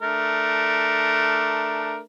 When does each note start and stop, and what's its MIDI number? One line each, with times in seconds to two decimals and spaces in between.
0.02 1.99 57
0.02 1.99 62
0.02 1.99 70